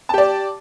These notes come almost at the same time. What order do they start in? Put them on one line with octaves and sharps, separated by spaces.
A5 G4 D5